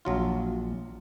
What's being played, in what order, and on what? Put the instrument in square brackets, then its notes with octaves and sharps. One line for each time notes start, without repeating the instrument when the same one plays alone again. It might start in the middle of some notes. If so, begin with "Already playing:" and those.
[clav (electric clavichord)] A#1 F#3 F4